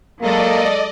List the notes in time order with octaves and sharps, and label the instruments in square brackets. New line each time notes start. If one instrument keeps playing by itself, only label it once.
[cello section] F#3 G#3 A4 [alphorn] A#3 [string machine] D5 D#5